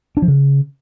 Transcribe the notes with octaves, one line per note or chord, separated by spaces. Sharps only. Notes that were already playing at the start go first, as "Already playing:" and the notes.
D4
F3
C#3